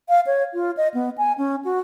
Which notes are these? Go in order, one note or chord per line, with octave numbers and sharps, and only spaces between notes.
F5
C#5
F4
D#5
B3
G#5
C#4
F#4